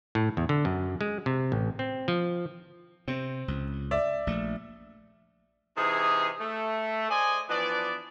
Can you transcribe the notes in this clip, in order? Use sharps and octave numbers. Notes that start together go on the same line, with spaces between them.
A2
E2
D3
F#2
G#3
C3
A1
C4
F3
C3 C4
C#2
D5 E5
A#1 A3
C3 E3 D#4 G#4
A3
G#4 C5 D5 D#5 G#5
E3 F3 B3 D4 D5